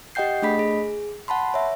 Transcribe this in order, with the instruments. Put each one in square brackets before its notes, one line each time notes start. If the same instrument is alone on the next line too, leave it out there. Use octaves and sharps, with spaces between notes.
[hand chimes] G4 D#5 F#5 G5 G6 C7
A3 D4 G#4 D#5 B5 B6
G#4
F#5 A5 B5 C6
C#5 E5